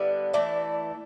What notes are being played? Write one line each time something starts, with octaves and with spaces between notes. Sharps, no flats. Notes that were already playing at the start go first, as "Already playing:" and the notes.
Already playing: D3 G3 B3 E4 D5
E3 A3 E4 D5